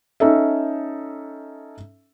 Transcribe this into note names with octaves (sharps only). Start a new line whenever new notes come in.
C#4 D#4 A4 E5